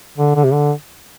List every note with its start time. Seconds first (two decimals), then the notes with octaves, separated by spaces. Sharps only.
0.17 D3
0.36 D3
0.44 C3
0.53 D3